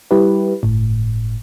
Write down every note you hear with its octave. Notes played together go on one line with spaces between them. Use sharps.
G3 E4 G4 B4
G1 A2